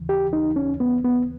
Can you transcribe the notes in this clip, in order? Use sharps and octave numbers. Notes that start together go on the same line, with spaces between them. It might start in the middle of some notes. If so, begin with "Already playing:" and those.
Already playing: D#2 C#3 E3
G4
D#4
C#4
B3
B3